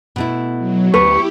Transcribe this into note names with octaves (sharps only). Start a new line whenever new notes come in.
B2 A3 E4
F#3
D2 E4 G4 B4 C#6